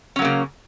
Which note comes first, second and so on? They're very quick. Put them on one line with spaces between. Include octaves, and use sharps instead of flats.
C#4 F#3 A#3 C#3